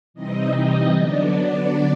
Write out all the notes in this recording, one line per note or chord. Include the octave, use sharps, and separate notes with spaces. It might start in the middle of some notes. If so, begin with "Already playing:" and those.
C3 E3 G3 C4 D#4 D#5
D3 F#3 B3 D4 D5